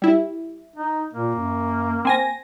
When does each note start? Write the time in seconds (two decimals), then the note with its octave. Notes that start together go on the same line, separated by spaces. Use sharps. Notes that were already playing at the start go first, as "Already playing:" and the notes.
0.02 G3 E4
0.76 D#4
1.13 A#2 A#3
1.35 F#2
2.05 C4 G#5 A#6